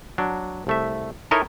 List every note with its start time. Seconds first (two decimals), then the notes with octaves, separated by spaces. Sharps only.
0.18 F#3 D4
0.67 C2 A3 E5
1.31 D#4 E4 A4 A#4 C#5 D#5